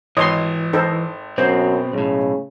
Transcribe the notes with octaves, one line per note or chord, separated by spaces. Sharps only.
G#1 E3 C#5 D#5 C6 D#6
D#4 A4 C5
F#2 B2 C4 C5
B1 A2 C#3